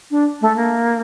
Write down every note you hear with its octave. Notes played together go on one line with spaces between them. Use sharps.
D4
A3
A#3